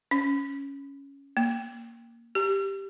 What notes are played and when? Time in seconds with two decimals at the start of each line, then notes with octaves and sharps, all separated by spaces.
0.11 C#4
1.37 A#3
2.35 G4